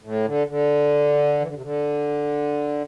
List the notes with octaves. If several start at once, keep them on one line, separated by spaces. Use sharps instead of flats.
A2
D3
D3
E3
D3
C3
D3